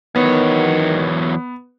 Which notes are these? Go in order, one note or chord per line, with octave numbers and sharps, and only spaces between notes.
E2 D#3 F#3 B3 C#5